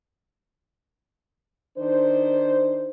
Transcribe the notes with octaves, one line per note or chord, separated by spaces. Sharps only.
D#3 D4 C5